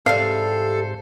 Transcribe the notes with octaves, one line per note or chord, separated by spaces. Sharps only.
G#2 C3 E3 G3 A4 C5 F5